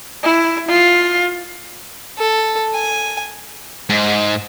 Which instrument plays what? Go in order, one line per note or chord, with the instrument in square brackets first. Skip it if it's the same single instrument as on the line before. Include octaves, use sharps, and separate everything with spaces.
[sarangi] E4
F4
[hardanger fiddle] A4
G#5
[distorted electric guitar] G#2